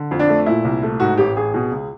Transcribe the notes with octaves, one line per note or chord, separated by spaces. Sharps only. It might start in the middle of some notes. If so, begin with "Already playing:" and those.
Already playing: D3
F2
D4
A3
A#2 E4
C2
A3
G#2 F#4
A1 G4
A1 G#4
B2
C#2